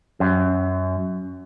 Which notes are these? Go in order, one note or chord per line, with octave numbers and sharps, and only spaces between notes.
F#2